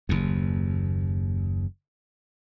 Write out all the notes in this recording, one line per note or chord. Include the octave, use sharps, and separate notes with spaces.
F#1 D#2